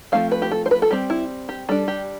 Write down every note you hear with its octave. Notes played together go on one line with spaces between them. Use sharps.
F3 A3 C4 F5
B4
G4
A4
C5
B4
A4
G3 C4 G4
E4
G4
G3 D4 A4
G4